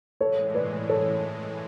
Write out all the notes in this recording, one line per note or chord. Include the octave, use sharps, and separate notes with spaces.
A2 E3 G#3 A4 C#5
B4 D5
A4 C#5